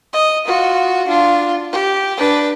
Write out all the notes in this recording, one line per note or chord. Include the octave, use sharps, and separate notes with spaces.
D#5
F4 F#4
D4 F4
G4
D4 B4